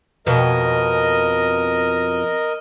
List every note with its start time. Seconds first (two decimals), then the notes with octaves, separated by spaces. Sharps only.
0.27 F2 B2 A#4 D#5